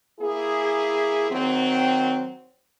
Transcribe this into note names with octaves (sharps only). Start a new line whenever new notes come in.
A#3 E4 G#4
D#3 F#3 C4